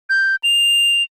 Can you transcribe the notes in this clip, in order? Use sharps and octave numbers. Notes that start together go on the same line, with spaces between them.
G6
F7